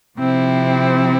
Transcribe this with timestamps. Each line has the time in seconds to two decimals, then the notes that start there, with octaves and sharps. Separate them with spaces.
0.18 C3 F3 C4 E4